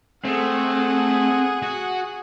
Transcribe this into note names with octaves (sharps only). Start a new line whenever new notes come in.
A3 C4 G#4 F#5
F#4